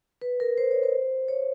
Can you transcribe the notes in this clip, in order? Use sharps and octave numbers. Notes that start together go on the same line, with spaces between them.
B4
A#4
C5
C#5
C5
C#5